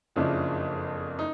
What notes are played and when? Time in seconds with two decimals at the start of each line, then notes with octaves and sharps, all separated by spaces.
0.16 F#1 F2 C#3 F3 D4 E4
1.19 D#4